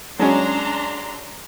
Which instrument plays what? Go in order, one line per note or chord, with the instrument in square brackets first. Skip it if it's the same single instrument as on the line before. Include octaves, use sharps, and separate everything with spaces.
[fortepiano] F#3 G#3 C#4 [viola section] D4 A#5 C6